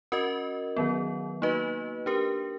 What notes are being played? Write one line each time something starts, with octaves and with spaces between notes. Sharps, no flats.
C#4 F#4 A#4 D#5
D#3 F#3 B3
A#3 D#4 F#4 B4 D#5
D4 G4 A#4